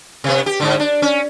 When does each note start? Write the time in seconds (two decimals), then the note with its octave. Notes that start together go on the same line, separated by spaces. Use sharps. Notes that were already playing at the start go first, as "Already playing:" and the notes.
0.24 C3 B3
0.46 G4
0.60 G#2 D3
0.80 D4
1.02 C#4